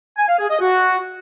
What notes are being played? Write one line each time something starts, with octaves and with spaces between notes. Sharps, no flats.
G#5
F5
G#4
D#5
F#4